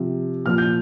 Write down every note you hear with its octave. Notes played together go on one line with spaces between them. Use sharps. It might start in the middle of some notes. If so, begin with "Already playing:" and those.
Already playing: C3 F3
A#2 F3 F6
G6